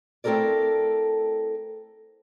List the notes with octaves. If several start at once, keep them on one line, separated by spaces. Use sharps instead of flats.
A3 C4 E4 A4 A#4 D5